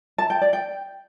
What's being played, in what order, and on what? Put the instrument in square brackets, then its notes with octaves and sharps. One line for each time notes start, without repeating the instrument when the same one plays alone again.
[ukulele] A5
G5
D5
G5